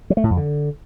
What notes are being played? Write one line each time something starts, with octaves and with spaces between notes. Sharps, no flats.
F#3
A3
A2
F2
D3